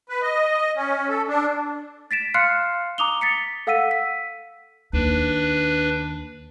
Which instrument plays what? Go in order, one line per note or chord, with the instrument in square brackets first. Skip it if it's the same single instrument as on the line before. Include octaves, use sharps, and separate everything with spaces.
[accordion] B4
D#5
C#4
A4
D4
[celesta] A6 B6 D7 E7
F5 C6 F6 F#6 C7 C#7
A#5 D6 D#6 F7 G7
A6 B6 C#7
A4 F5 F#5 E6 B6 D#7
B6
[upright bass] D#2 [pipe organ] D4 B4